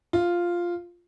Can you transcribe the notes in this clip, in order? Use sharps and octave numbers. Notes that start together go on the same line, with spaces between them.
F4